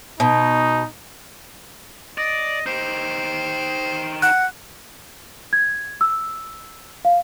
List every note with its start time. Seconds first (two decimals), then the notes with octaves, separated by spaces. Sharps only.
0.20 B2 D#4
2.18 D5 D#5
2.66 D#4 G4 C5
4.22 F#5 F#6
5.53 G#6
6.01 E6
7.05 F5